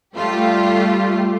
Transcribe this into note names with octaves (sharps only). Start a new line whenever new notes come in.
G3 A3 F4 G4